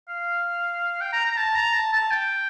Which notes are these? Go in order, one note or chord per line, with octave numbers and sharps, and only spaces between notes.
F5
G5
A#5
A#5
A5
A#5
A5
A5
G5